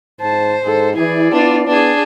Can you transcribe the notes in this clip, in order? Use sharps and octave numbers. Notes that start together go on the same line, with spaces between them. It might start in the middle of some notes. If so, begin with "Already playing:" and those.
G#2 C5 A5
G#2 A4
E3 E4 G#4 D5
B3 D4 F4
B3 D4 G#4